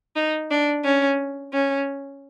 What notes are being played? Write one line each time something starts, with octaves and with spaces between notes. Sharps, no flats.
D#4
D4
C#4
C#4